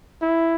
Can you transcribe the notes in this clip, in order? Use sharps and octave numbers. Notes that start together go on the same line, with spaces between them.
E4